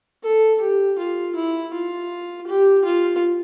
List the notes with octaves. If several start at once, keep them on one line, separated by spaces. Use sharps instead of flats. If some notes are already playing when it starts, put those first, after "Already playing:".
A4
G4
F4
E4
F4
G4
F4